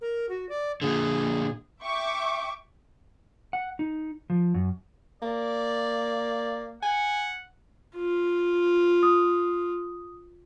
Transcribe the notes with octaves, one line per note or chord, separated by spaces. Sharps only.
A#4
F#4
D5
A#2 D3 G#4
E5 G5 C#6 D6
F#5
D#4
F3
F#2
A#3 D5
F#5 G#5
F4
D#6